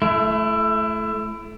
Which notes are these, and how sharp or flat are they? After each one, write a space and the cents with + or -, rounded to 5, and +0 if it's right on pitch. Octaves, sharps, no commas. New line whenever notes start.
A3 -20 E4 +25